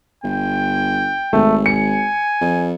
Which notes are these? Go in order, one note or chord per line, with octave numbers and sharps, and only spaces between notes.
G1 G5
G#1 A3
G#5 C#7
F2